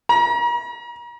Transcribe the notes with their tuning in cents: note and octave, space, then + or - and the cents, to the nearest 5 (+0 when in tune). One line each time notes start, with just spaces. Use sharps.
A#5 +40